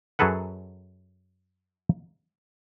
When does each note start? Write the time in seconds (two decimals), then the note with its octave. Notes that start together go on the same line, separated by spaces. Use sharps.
0.19 F#2 F#3 G#4 A4 B4 F#5